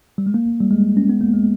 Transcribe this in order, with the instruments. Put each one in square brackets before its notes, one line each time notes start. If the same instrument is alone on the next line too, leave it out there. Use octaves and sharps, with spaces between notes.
[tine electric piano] G3
G#3
A#3
G3
G#3
C#4
B3
A#3
G#3